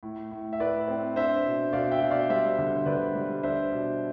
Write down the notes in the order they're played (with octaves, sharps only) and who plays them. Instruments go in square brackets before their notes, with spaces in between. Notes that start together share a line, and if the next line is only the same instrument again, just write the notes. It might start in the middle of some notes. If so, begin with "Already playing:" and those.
[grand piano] A2
A2
E5
A2 B4 D5
C4
D4 C5 E5
B2
B2 D5 F5
E5 G5
B2
D5 F5
G3 C5 E5
D3
C5
D3 B4 D5
G3
D4 C5 E5
B2